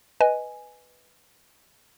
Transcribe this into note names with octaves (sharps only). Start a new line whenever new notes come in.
B4 D#5 G#5